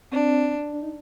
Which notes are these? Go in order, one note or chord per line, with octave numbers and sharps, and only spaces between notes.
C4 D4
D4
D#4